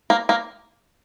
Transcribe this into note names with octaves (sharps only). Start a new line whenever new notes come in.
A#3
A#3